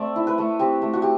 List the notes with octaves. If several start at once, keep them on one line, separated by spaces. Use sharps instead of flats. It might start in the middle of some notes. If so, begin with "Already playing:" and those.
Already playing: A3 C4 D5 E5
E4
B4
A3
C4 G4
A3
F#4
G4